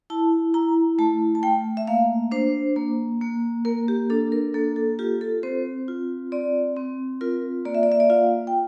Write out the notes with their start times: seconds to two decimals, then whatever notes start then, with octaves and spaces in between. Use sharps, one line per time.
0.10 E4 A5
0.54 E4 A#5
0.99 A3 A5
1.35 A5
1.43 A3 G5
1.77 E5
1.87 A#3 F5
2.31 D4 C5
2.76 A#3
3.21 A#3
3.65 A#3 A#4
3.88 G4
4.10 D4 A4
4.32 A#4
4.54 A#3 A4
4.76 A4
4.99 F4 G4
5.21 A4
5.43 C4 C5
5.88 F4
6.32 C4 D5
6.76 C4
7.21 F4 A#4
7.65 A#3 D5
7.75 E5
7.83 D5
7.92 E5
8.00 D5
8.10 F4 F5
8.47 G5